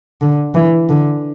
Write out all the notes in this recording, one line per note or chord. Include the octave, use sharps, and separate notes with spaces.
D3
E3
D3